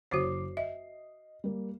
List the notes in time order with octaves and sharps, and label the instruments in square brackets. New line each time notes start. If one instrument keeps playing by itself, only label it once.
[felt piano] F#1 D6 C7 [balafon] F#4 C5 C#5
[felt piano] D#5 [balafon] E5
[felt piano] G3 A#3